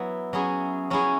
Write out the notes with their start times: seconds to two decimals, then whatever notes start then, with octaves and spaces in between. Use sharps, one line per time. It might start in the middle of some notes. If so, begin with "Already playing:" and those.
Already playing: F#3 B3 E4
0.33 F#3 C#4 E4 G#4
0.90 F#3 C#4 E4 G#4